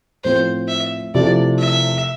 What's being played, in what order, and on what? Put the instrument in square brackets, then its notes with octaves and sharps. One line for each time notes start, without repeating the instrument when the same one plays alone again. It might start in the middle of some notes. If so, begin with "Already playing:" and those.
[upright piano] A2 F3 C4 F4 [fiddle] C5
[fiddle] E5
[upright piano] C3 F3 A3 E4 [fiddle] D5
[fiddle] E5